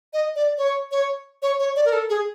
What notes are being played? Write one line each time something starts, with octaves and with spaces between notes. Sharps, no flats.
D#5
D5
C#5
C#5
C#5
C#5
D5
A#4
A4
G#4